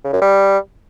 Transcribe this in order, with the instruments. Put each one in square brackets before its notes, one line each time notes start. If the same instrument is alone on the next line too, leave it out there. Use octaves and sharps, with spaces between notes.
[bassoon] C#3
F#2
G3